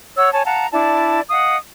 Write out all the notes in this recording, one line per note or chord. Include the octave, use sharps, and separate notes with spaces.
C#5 F#5 E6
C#5 G#5 A5
F5 F#5 A5 A#5
D4 E4 D5 A5
D#5 F5 F#5 D#6